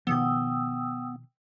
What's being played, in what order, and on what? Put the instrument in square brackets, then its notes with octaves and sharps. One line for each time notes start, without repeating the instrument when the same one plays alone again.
[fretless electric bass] B2 D#3 F3 [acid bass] B3 [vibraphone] G5 D#6 E6